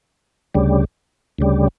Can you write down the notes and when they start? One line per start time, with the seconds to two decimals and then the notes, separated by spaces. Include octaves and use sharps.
0.55 D2 C#3 G3
1.38 D2 C#3 G3